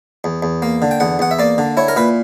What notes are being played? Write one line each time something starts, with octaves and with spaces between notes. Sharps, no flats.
E2
E2
A#3
D3
G5
E2 F#5
E2 F#5
E5
A#3 D5
D3
E4 C#5
A#4
A#2 B4